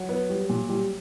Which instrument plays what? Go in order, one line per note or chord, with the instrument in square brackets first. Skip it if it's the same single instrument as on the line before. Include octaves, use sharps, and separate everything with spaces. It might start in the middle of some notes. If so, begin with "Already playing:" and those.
Already playing: [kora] F#3
[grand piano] B3
G3
A#2
G3